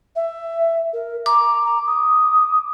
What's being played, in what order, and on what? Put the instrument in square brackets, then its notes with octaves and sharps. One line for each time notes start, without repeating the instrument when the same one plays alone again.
[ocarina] E5
A#4
[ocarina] A#5 [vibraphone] D6
[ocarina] A#5
D#6